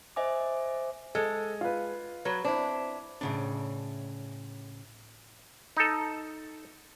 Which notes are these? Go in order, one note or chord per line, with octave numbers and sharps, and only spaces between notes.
C5 D#5 E5 G#5 D6
G#3 A4
F4 B4
F#3 B4
C4 D4 E4
A2 C#3 D4
D#4 A4